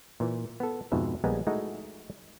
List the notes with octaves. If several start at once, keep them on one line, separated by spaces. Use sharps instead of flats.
A#2 E3
B3 A4
F2 G#2 B2 E5
A#1 G3 G#3 B3 G#5 A#5
G#3 A3 D#4 E4 F#4